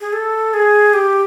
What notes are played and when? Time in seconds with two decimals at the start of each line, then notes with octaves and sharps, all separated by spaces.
0.01 G#4
0.13 A4
0.54 G#4
0.94 G4